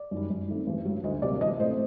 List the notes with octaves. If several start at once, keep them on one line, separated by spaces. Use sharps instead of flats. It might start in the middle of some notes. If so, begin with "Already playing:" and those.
Already playing: D5
F#2 D#3 G3
F#2
D#3 A3 C4
A1
G2 F#3
D2 D#5
C3 F#3 A#3 D5
A1 D#5
A2 A3 C4 C5